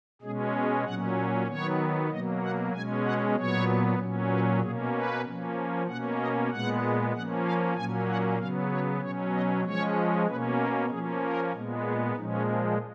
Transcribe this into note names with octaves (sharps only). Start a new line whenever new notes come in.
B2 G#3 C#4 G#4
G#4
A#2 F#3 C#4 F#5
D#3 F#3 B3 C#5
B2 F#3 A#3 D#5
F#5
B2 G#3 C#4 G#5
F#5
A#2 F#3 B3 C#5
A#2 F#3 C#4
B4
B2 A#3 C#4 G#4
B4
F3 A#3 C#4
B2 A#3 C#4 F#5
D#5
A#2 G#3 B3 F#5
F3 A#3 C#4 F#5
F5
A#2 F#3 A#3 C#4 G#5
F#5
C#3 F#3 B3 F5
C#5
B2 F#3 C#4 C#5
D#5
F3 G#3 C#4 C#5
B2 A#3 C#4 B4
A#4
F3 A#3 C#4 G#4
A#4
A#2 G#3 B3
G#4
A#2 F3 G#3 C#4 D#4
C#4